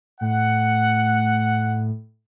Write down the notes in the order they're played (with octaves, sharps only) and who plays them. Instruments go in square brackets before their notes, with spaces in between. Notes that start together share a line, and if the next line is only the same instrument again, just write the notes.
[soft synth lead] A2 [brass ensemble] F#5